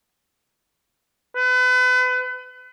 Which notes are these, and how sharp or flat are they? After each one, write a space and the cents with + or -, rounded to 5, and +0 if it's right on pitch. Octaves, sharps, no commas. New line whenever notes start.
B4 +35